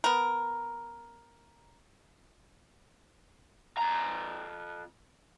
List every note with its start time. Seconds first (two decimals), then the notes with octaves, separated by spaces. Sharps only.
0.04 B3 A#4
3.77 F2 A#5